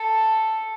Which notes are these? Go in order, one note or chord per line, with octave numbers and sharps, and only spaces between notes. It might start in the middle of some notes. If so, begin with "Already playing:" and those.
Already playing: A4